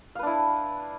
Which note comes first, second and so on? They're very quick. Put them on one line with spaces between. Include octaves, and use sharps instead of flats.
F5 B4 D4 E4